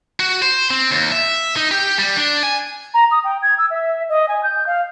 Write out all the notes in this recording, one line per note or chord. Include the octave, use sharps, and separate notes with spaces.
F#4
C5
C4
D#2
E5
D#4
G4
G3
D4
G#5
A#5
D#6
G5
G#6
E6
E5
D#5
G#5
G6
F5